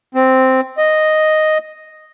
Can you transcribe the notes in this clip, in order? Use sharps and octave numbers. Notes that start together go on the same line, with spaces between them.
C4
D#5